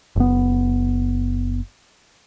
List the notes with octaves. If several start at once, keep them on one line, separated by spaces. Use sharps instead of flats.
F#1 B3